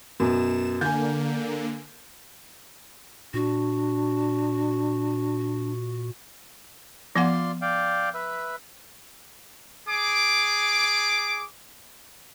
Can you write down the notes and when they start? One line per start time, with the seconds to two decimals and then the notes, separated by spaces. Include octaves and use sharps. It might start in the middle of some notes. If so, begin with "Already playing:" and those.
0.20 F#2 B2 E7
0.81 D3 A#3 G#5 G6
3.34 A#2 D4 F#4
7.16 F3 B3 F4 D5 F#5 C6
7.62 D5 F5 G5
8.14 B4 E5
9.89 G#4 D6